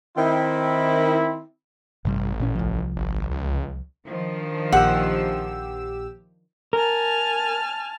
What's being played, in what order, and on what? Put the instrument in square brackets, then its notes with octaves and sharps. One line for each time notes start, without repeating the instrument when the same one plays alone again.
[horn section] D#3 C4 E4
[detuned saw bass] A1 [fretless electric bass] G2 C3 G3
[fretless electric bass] A#2 C#4
C2 F3
[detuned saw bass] G#1
C#2
[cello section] D#3 F3 D4
[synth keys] A#1 G4 E6 [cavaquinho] F#5
[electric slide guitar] A#4 [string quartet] G#5 A5 F6